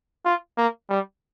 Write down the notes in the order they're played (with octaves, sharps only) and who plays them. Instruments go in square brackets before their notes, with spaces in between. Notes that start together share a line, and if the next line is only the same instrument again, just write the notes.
[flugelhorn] F4
A#3
G3